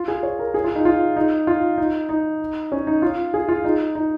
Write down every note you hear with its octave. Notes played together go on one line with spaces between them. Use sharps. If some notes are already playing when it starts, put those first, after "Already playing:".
Already playing: F4
G#4
C#5
A#4
G#4
F4
D#4
F4
D#4
F4
D#4
D#4
C#4
D#4
F4
G#4
F4
D#4
D#4